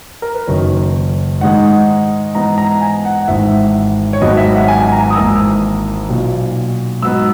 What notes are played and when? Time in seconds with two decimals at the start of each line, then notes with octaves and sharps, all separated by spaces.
0.22 A#4
0.35 B4
0.47 F#1 F#2 D#3 F#3 C#5
1.41 G#2 D#3 G#3 D#4 F#5
2.35 G#2 E3 B3 D#4 A#5
2.58 A#5
2.81 G#5
3.05 F#5
3.21 F#5
3.28 G#1 G#2 E3 E5
4.13 C#5
4.21 G#1 G#2 F#3 B3 D#5
4.37 E5
4.53 F#5
4.68 G#5
4.80 G#5
4.92 A#5
5.04 A#5
5.10 D#6
5.15 G#1 G#2 E3 A#3 E6
6.09 B1 A#2 F#3
7.02 G#2 F#3 B3 D#4 E6